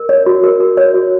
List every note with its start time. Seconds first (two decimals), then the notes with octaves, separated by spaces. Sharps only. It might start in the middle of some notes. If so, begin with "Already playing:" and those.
Already playing: A#4
0.09 C#5
0.26 F#4
0.44 A#4
0.60 A#4
0.77 C#5
0.94 F#4